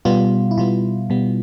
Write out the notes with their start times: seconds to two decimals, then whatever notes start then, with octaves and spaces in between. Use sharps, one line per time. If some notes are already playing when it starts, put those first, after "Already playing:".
0.05 B2 G3 B3 F4
0.51 E4
0.57 B2 G3 B3 F4
1.10 B2 G3 B3